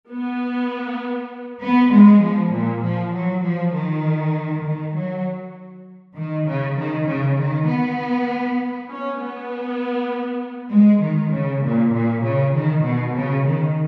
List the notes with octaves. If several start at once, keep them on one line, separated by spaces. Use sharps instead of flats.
B3
B3
G#3
F3
A#2
F3
F#3
F3
D#3
D#3
F#3
D#3
C#3
D#3
C#3
D#3
B3
C#4
B3
G#3
D#3
C#3
A#2
A#2
C#3
D#3
B2
C#3
D#3